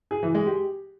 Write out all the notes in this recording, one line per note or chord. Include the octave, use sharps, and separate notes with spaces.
G#4
E3
G#3
G4